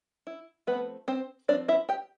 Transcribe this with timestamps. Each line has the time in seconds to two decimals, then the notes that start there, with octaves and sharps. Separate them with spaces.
0.27 E4
0.67 F3 A3 B3 C4 B4
1.08 C4 C5
1.48 F3 A3 C4 D4 D5
1.68 E4 E5
1.89 G4 G5